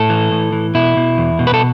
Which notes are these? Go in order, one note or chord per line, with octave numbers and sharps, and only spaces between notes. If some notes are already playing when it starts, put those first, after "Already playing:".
Already playing: A2 A4
E3
A2
E3
B2 E4
B2
E2
B2
B4
A4